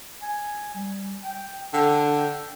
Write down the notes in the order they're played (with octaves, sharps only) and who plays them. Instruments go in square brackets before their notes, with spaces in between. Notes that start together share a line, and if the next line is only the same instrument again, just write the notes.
[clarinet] G#5
G3
G5
[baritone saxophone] D3 [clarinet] G5